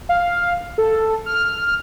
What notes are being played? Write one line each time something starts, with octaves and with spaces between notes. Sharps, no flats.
F5
A4
F6